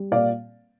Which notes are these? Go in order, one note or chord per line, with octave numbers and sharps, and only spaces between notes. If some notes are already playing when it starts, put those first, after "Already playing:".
Already playing: G3
A#2 D5 F5